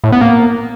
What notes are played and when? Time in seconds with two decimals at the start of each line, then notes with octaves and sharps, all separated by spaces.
0.04 A2
0.12 B3
0.21 A#3